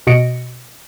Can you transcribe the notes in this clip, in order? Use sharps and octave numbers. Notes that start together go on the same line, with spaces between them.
B2 F#4 D#5 A#6 C#7 D7